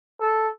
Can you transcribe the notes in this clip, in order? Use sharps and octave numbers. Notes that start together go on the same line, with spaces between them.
A4